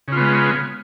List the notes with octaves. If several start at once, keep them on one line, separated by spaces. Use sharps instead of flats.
C#3 G#3 B3 F4